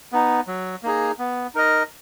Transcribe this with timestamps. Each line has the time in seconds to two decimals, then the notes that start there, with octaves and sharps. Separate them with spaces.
0.12 B3 D#4
0.47 F#3
0.83 A#3 D#4 G#4
1.19 B3
1.55 D#4 A#4 D#5